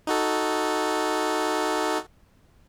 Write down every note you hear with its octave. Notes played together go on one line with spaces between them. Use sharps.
D#4 F#4 A4